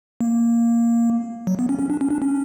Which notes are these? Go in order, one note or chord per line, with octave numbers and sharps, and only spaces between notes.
A#3
F#3
B3
C#4
C#4
D4
C#4
D4
C#4